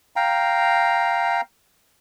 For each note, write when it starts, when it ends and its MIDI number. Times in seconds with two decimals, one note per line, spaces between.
0.16 1.41 77
0.16 1.41 79
0.16 1.41 82